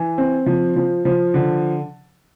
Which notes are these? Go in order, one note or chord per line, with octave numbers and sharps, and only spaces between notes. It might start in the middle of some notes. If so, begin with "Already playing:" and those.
Already playing: E3
C4
F3
F3
F3
D3